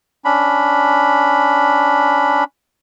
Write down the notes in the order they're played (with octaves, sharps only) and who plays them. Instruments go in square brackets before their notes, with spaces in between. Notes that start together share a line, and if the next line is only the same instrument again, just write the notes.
[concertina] C#4 D4 B5